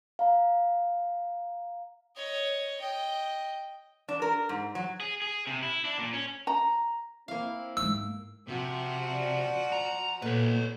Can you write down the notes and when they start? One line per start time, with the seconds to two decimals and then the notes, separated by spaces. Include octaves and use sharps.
0.19 F5 A#5
2.16 C#5 D#5
2.81 D#5 G5
4.09 D4
4.22 A#4
4.49 G#2
4.75 F#3
5.00 G#4
5.22 G#4
5.47 C3
5.63 E4
5.85 D4
5.98 A#2
6.13 C#4
6.47 A#5
7.28 A#3 C4 E4 F5
7.77 G#2 G#3 E6
8.48 C3 F3 F#4
9.12 D5
9.72 A#5
10.22 A#2 B3 A4 B4 C#5